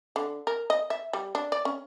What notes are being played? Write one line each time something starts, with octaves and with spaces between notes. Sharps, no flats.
D3
A#4
D#5
E5
G3
D4
D5
C#4